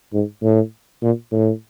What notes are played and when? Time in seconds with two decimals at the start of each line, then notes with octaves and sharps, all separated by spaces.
0.13 G#2
0.42 A2
1.02 A#2
1.32 A2